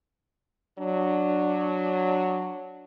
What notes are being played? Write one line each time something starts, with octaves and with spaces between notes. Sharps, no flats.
F#3 D4